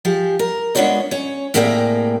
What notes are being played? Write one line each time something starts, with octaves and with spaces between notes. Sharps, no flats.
F3 G4 G#4
A#4
G#3 B3 D4 F4 C#5 D#5
C#4 C#5
A2 C3 A#3 G#4 D5 G5